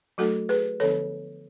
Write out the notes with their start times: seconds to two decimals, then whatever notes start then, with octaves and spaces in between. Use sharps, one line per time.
0.18 F#3 A3 D4 F#4 A4
0.49 G#4 B4
0.80 D3 F3 B3 D4 A4 C#5